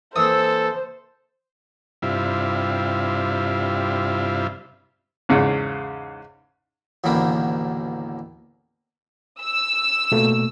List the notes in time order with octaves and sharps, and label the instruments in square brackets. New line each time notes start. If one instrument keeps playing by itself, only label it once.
[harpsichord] E3 A#3 C4 [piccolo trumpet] A4 [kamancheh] C5 [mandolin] D#6 E6
[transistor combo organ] G2 C3 E4 F4
[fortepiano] E2 G#2 C#3
[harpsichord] A1 D#2 B2 D3 A#3 B5
[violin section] E6
[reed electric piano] B2 A3 A#3